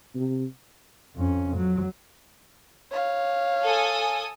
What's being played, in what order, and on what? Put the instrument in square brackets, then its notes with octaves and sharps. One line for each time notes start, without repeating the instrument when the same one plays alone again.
[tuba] C3
[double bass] F2 C#4
F#3
[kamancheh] C#5 F5
[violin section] A4 G#5 D#6